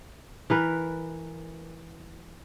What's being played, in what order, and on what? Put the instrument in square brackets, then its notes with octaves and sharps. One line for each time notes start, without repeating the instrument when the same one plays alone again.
[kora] E3 A#4 B4